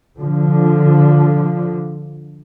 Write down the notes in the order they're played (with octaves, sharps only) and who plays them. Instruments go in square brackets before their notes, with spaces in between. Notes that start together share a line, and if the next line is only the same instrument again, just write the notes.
[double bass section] D3 F3